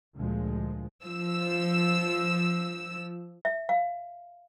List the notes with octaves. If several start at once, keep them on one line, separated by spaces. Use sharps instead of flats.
D2 A#2 F3 G#3
F3 E6
E5
F5